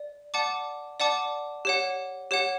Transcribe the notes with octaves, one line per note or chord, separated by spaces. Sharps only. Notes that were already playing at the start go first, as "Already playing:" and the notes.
Already playing: D5
D5 F#5 A5 D6
D5 F#5 A5 D6
G4 C#5 F#5
G4 C#5 F#5